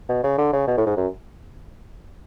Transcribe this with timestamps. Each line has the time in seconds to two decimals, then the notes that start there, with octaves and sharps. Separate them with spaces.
0.09 B2
0.23 C#3
0.38 D3
0.53 C#3
0.67 B2
0.77 A2
0.86 G#2
0.97 F#2